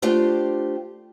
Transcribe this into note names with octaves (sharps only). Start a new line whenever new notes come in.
A3 D4 F4 G4 C5